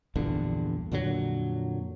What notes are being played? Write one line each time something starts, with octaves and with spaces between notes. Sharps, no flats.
A#1 E2 G2 D3
F2 A#2 D3 F#3